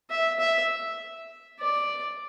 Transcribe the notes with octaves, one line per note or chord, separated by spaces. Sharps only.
E5
E5
D5